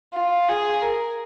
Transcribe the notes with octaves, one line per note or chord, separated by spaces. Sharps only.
F4
G#4
A#4